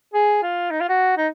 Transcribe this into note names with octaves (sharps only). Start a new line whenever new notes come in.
G#4
F4
D#4
F4
F#4
D#4